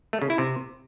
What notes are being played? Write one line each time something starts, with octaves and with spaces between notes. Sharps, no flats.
A3
C#3
E4
C3